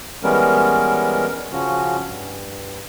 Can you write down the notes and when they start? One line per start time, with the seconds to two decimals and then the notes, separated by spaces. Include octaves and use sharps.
0.23 E3 G3 G#3 B3 C#4 A#4
1.52 C#3 F3 C#4 F#4
2.05 G2